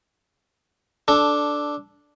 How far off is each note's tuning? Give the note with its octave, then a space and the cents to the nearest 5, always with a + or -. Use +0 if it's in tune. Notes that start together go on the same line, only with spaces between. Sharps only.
D4 +0 A4 -10